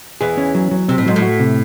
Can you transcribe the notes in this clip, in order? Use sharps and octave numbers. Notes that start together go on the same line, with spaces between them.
E2 E3 G#4
C#4
F#3
F#3
C3 C4
A2
G#2 F#3
A2
F#4
C3